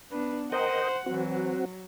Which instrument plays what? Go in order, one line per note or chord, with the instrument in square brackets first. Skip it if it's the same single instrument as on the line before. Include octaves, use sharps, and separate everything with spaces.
[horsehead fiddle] B3 D4 [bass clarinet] B4
[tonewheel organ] A#4 D#5 G5 [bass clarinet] C5 [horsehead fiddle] F#5
[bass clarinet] E3 [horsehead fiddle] F#3 [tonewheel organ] C4 F#4